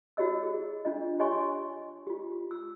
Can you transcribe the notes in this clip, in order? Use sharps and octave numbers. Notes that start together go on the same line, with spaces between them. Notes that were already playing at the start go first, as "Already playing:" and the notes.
E4 F#4 G4 C#5 D#5 E6
G#4
D4 F4 D#5
G4 C#5 D#5 G#5 C6 C#6
F4 G4
E6